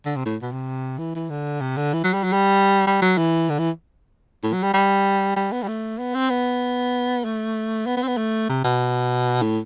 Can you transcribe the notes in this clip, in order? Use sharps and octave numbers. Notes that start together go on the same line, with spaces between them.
D3
C3
A2
B2
C3
E3
E3
D3
C3
D3
E3
F#3
G3
F#3
G3
G3
F#3
E3
D3
E3
A2
F#3
G3
G3
G3
B3
G3
A3
B3
C4
B3
A3
B3
B3
C4
B3
A3
C3
B2
A2